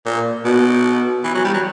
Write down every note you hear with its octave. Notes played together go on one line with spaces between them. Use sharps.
A#2
B2
E3
F#3
G3
F#3